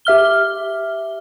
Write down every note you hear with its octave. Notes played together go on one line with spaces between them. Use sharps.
G4 E5 F6 G7